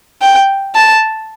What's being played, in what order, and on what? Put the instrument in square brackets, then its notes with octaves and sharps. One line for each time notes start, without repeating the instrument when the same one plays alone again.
[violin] G5
A5